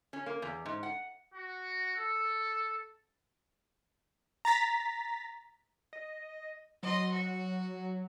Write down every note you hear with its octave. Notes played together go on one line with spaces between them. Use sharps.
C#4
A#3
E2
G#2
F#5
F#4
A4
A#5 A6 B6
D#5
F#3 D#5 C6
F#4